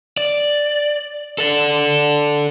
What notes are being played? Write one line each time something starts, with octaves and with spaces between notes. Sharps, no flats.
D5
A4 D5